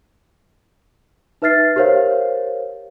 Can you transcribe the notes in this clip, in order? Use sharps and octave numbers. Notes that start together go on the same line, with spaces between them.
D#4 B4 E5 F6 A6 C7
G4 A#4 C5 C#5 F5